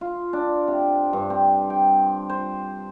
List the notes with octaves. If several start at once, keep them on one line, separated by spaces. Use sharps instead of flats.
F4
D4
C3
G2
C4
G5
C5